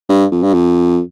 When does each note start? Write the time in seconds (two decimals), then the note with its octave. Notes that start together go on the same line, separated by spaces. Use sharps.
0.09 G2
0.31 F2
0.43 G2
0.54 F2